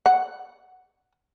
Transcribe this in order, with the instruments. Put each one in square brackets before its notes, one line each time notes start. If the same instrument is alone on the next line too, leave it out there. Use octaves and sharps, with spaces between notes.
[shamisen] F#5